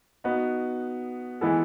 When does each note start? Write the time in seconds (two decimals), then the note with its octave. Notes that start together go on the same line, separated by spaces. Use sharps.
0.24 B3 D#4 F#4
1.41 E3 G#3 B3 E4 A4